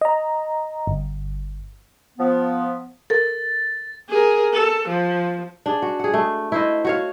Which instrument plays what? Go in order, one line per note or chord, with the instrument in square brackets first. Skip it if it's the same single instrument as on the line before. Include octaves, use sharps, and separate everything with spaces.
[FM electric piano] D#5 A#5
G1
[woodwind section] F3 B3
[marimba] A4 A#4 [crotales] A6
[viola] G#4 A#4
A4
F3
[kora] D4 G#4
F#4
G#4 F#5
A3
E4 C5 D#5
F#4 C#5 F5